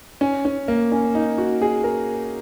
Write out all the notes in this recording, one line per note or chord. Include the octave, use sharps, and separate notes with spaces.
C#4
C#4
A#3
C#4
D#4
F#4
G#4
A#4